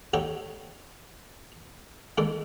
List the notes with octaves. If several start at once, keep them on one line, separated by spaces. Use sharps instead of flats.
D#4 F#4 G4 A4 C#5 D5
D#3 G#3 D4 A4 D5